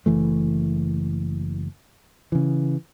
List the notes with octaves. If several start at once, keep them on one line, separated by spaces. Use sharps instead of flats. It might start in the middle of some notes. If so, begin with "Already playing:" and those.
F#1 E3 A3
C#3 E3